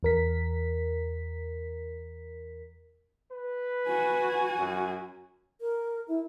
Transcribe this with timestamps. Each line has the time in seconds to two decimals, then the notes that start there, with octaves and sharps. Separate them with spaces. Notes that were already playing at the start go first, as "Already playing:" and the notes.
0.03 E2 A#4 B6
3.32 B4
3.88 F#4 G#5
4.58 F#2
5.61 A#4
6.08 E4